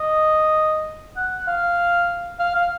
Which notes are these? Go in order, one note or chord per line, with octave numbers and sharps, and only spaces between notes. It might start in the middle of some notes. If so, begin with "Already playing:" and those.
Already playing: D#5
F#5
F5
F5
F5